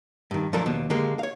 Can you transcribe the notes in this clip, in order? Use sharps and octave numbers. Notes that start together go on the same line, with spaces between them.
G2 D#3
F3 F#3 A3 D4 A4 A#4
D#2 B2
D3 G#3 A#3 G4
C#5 F5